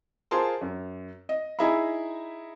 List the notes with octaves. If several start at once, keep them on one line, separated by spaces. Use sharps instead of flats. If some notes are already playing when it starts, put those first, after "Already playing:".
F4 G#4 A#4 C5 A5 C6
F#2
D#5
D#4 E4 G#4 E5 A#5 B5